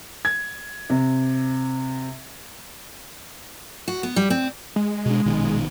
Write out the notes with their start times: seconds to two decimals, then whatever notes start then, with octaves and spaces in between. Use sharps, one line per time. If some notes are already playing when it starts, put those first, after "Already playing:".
0.25 G#6
0.90 C3
3.88 F#4
4.03 B3
4.16 G3
4.30 C4
4.76 G#3
5.05 B2 D4
5.26 A#1 B2 D#3